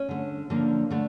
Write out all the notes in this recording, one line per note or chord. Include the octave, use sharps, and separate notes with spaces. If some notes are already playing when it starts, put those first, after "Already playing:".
Already playing: C#4
D3 A3
D3 F3 A#3
D3 A3 D4